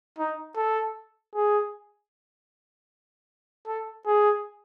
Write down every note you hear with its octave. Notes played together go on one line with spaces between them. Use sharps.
D#4
A4
G#4
A4
G#4